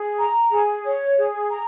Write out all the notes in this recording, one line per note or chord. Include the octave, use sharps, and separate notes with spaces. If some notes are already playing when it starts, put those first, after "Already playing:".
Already playing: G#4
A#5
G#4
C#5
G#4
A#5